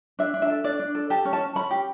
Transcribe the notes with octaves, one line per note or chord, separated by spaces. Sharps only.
D4 E5
D4
E5
A4
D4 D5
D4
A4
G4 A5
C#4
A5
C#4
C#4 B5
G4